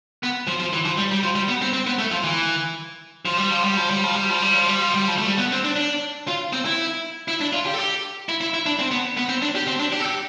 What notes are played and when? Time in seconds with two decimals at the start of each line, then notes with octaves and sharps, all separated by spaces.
0.23 B3
0.47 F3
0.60 F3
0.73 E3
0.85 F3
0.98 G3
1.11 G3
1.24 F3
1.35 G3
1.48 B3
1.62 C4
1.73 C4
1.87 B3
1.99 A3
2.12 F3
2.24 E3
3.25 F3
3.37 G3
3.51 F3
3.64 G3
3.77 F3
3.91 G3
4.04 F3
4.16 G3
4.29 F3
4.42 G3
4.55 F3
4.68 G3
4.81 F3
4.94 G3
5.08 F3
5.18 A3
5.26 G3
5.38 B3
5.52 C4
5.64 D4
5.76 D4
6.28 F4
6.53 C4
6.66 E4
7.28 E4
7.41 D4
7.53 F4
7.66 G4
7.74 A4
7.78 G4
8.29 E4
8.41 E4
8.54 E4
8.66 D4
8.79 C4
8.91 B3
9.17 B3
9.29 C4
9.42 D4
9.55 G4
9.68 C4
9.80 D4
9.93 G4
10.00 A4
10.06 G4